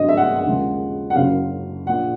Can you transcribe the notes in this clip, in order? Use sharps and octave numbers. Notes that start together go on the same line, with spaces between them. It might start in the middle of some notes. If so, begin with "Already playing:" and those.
Already playing: G#1 G2 D3 F#3 D#5
E5
F#5
F#5
D#2 C#3 F3 G#3
F#5
F#1 F#2 C#3 F#3 F5
A#1 A#2 F3 F#5